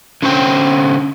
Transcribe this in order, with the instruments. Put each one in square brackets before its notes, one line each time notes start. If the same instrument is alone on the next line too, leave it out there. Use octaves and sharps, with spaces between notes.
[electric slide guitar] D3 C#4 C5 G5